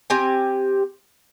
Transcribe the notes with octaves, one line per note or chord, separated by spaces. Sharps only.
C4 G4 G#5